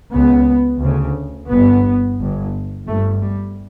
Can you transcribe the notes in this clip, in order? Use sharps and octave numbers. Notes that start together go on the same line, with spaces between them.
C#2 C#3 B3
D2 C#3
G1 G2 B3
G1 G2
G1 G2 A3
G3